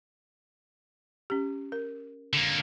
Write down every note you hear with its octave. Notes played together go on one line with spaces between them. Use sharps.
C#4 G4
A#4
D3 A#3